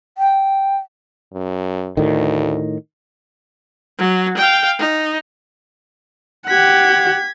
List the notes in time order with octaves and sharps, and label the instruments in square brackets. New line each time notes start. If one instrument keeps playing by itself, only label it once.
[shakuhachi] G5
[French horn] F#2
[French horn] D2 [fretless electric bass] A2 D#3
[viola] F#3
F5 G5
D#4
[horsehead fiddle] G4 F#5 [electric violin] G#6 B6